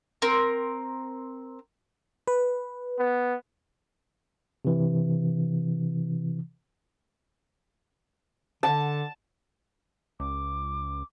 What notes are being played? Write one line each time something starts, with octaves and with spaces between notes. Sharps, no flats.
C4 A#4
B4
B3
C3 E3
D3 A5
C#2 D6